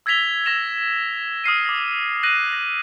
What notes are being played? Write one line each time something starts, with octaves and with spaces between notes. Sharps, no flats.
E6 G#6 A#6 B6 F7 G7
E6 A#6 E7 F7
D#6 F6 C7 D#7
D6 A#6
F#6 A#6 D#7 F#7
A#6